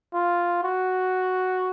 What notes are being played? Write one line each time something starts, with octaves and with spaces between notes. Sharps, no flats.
F4
F#4